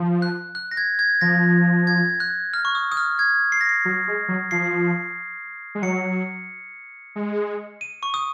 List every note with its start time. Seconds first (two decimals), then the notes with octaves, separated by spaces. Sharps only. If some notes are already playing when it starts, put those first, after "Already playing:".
Already playing: F3
0.22 F#6
0.55 F#6
0.71 A#6
0.77 G#6
0.99 G#6
1.21 F3 A#6
1.87 G#6
2.20 F#6
2.54 F6
2.65 C#6
2.75 D#6
2.92 D#6
2.97 F6
3.19 G#6
3.52 C7
3.61 A#6
3.69 C7
3.85 F#3
4.07 G#3
4.28 F#3
4.51 F3 C7
5.75 G#3
5.83 F#3 C#7
7.16 G#3
7.81 D#7
8.03 C#6
8.14 D#6